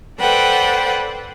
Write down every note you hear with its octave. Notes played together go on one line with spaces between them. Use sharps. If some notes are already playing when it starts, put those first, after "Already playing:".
A4 B4 C5 D5 F#5 G5